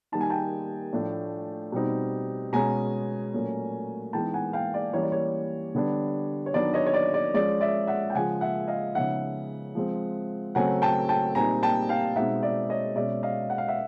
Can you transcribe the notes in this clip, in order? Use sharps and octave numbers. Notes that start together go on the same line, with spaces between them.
D#3 G3 A#3 D#4 A5
G#5
G5 A5
A2 F3 A3 D4
B2 G3 C4 D#4
B2 G#3 C#4 G#5 A#5
A#2 F#3 A3 C#4
E3 G#3 B3 D#4 G5 A5
F#5 G#5
F5 G5
D5
E3 G3 A#3 C#4 C#5
D5
C#5
D3 G3 B3 D4
C#5
D#3 F#3 B3 D4 D5
C#5 D#5
C#5
D5
D5
F3 G#3 C#4 D5
D5 E5
E5 F#5
G5
C#3 F3 G#3 F#5 G#5
E5 F#5
D#5 F5
C#3 F3 G#3 B3 D#4 E5 F#5
F3 G#3 C4
C#3 F#3 A3 C4 F#5 G#5
G5 A5
G5 A5
A#2 G3 C4 D#4 G#5 A#5
G5 A5
F5 G5
B2 G#3 C4 D#4 E5 F#5
D5 E5
C#5 D#5
B2 G#3 C#4 D5 E5
D#5 F5
F#5
F5
E5 F#5